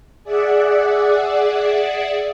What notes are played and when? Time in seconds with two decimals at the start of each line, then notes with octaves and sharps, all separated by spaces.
0.24 G#4 D5 E5 F#5